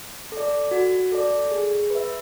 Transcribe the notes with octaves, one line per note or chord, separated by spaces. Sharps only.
A4
D5
F#4
A4 D5
G#4
B4 E5